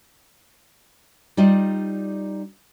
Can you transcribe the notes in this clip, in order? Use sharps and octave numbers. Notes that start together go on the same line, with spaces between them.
G3 D#4 F4 D5 D#5